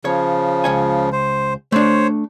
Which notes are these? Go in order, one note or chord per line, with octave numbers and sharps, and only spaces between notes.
C#3 F3 C#5
C#2 C#5 G#5
C5
A3 D4 C5 C#5